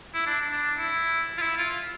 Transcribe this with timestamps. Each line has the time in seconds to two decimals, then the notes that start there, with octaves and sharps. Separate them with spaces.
0.14 E4
0.27 D4
0.52 D4
0.78 E4
1.37 F4
1.42 E4
1.58 F4